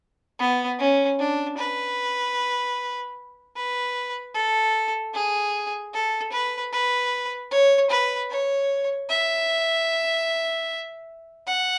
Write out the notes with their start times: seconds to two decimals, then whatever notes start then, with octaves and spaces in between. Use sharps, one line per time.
0.39 B3
0.79 C#4
1.19 D4
1.58 B4
3.56 B4
4.34 A4
5.14 G#4
5.94 A4
6.32 B4
6.72 B4
7.51 C#5
7.90 B4
8.30 C#5
9.10 E5
11.47 F#5